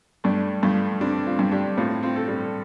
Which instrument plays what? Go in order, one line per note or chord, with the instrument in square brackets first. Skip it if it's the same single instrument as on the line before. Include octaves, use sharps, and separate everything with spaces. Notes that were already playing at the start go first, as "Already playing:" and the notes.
[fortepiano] G2 [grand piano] A3 D4
[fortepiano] G2 [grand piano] F3 A3
[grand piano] G3 C4 [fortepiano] D4
[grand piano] C4 F4
[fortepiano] G2
[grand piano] D4 G4
[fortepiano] A2 [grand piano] C4 F4
[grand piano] C4 F4
[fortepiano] A4
[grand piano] G3 C4